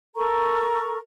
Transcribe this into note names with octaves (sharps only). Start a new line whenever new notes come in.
A4 A#4 A#5 C#6